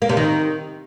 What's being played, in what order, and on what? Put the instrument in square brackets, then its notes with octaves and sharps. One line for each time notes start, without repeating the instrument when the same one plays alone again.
[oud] A#3
C3
D#3